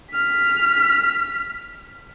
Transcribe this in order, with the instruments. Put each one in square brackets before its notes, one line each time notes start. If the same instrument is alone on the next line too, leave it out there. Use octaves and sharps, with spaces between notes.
[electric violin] F6 B6